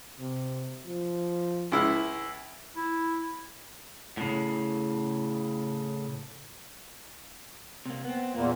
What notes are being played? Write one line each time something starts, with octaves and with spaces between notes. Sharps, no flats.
C3
F3
C#2 E4
E4
A2 C#3
C3 A#3
B3 C4
E2 A#2 A#3